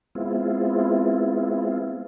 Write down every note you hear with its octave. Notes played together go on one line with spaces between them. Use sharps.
G#3 B3 C4 E4 F4